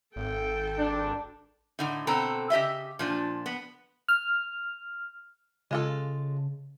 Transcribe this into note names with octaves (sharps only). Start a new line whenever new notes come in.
G#1 A4 G5
D4
A2 D3 D#4
B2 D3 C4 A4 A#5
C#3 G4 D#5 E5
A#2 F3 D4
B3
F6
C#3 G#3 F4 A4